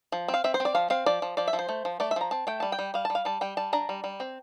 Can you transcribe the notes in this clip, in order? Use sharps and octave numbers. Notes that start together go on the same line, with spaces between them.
F3
C4
F5
C4 E5
C5
C4
D5
F3 F5
C4 F5
F3 D5
F3
F3 D5
E5
F3
C5
A3
F3
A3 D5
E5
F3 A#5
C4 A5
A3 G5
G3 A5
G5
G3
G3 F5
A5
G3
F5
G3 A5
G3 G5
G3 A5
D4 A#5
G3
G3
C4